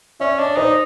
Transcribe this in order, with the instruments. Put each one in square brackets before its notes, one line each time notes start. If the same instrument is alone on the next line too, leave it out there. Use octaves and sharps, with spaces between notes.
[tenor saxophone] C#4 [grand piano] D5 E5
[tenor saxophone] D4 [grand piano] C#5 D#5
[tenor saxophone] D#4 [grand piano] C5 D5